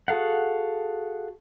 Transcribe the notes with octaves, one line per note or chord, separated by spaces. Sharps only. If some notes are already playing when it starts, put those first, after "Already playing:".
F#4 G#4 A4 F5 F#5